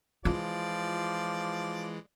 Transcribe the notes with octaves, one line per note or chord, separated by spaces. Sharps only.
E3 F3 G#3 F4 D5